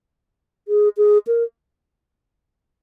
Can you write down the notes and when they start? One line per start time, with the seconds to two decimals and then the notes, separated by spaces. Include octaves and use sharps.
0.68 G#4
0.97 G#4
1.27 A#4